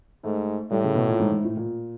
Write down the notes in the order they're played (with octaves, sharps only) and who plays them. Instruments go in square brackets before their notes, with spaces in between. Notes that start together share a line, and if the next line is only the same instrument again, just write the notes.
[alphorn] G#2 [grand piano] A3
[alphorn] A2 [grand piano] G3
[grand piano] C#3
B2
A#2
G#2
G#2
A2
A#2